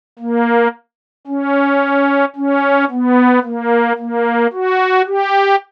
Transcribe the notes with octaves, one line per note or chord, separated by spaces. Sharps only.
A#3
C#4
C#4
B3
A#3
A#3
F#4
G4